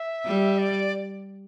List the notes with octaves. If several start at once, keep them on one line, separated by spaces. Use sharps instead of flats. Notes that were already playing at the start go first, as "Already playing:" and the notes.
Already playing: E5
G3
D5